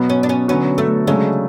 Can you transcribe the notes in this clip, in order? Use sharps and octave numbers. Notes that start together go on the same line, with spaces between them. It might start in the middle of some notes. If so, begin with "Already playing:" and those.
Already playing: B2 F#3 B3
C#4
D4
C#4
D3 F#3 B3 C#4 F#4
A3
C#3 F#3 G#3 A3 D4